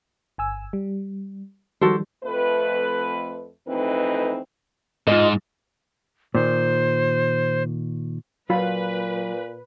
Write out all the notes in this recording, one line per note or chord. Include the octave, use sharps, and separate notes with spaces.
G1 G#5 E6
G3
D#3 F3 G3 F#4 A4 C5
F2 A3 B4
F2 E3 A3 C4 D#4 B4
G#2 F4 D#5
A#2 D#3 C5
A#2 F#3 F4 B4 B5